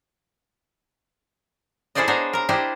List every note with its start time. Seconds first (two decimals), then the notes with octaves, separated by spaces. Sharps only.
1.95 E4 G#4 A4 C5 D5 D#5
2.08 B3 D4 C5 C#5 D#5 A#5
2.33 A#4 A#5
2.49 D4 E4 G4 C5 D5 D#5